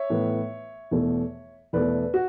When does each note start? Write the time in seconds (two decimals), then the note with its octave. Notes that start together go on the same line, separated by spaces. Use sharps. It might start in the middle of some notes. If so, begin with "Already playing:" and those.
Already playing: C#5 E5
0.10 A2 E3 B3
0.91 E2 B2 A3
1.73 E2 B2 A3 B4 D5
2.14 F#4